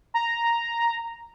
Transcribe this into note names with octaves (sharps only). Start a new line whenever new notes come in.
A#5